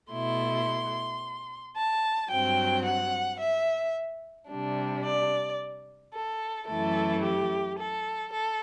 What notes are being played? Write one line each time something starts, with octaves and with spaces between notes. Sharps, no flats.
B2 A3 E4 C6
A5
G2 F#3 C4 G5
F#5
E5
C3 G3 D4
D5
A4
F#2 E3 A3 E4 A4
G4
A4
A4